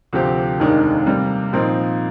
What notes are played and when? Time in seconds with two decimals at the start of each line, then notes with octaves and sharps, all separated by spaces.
0.13 D2 C3 F3 C4 G4
0.59 F1 D#2 D#3 G#3 D4
1.06 C3 G3 A#3
1.53 A#2 F3 C4 D#4 A#4